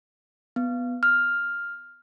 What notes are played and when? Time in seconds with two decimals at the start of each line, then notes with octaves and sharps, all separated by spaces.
0.56 B3
1.03 F6